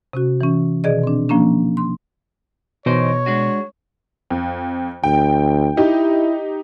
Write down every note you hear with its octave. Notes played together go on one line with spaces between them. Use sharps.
C3 C#4 F#4
E3 C#4
B2 D#3 G#4 D5 D#5
C4 D4
F3 A#3 C#4 D4
C6
B2 E3 D#4 C5 C#5
G#3 D4 F#4
F2
D2 G5
D#4 E4 G4